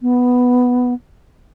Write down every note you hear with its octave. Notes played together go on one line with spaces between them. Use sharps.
B3